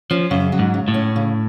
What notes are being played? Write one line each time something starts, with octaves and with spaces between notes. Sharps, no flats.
F3 C#4
F#2 C#3
F#3
G#2
C#3
A2
C#4
C#3